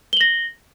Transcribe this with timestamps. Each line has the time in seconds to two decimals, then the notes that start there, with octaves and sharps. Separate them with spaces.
0.13 G7
0.17 F#7
0.21 A#6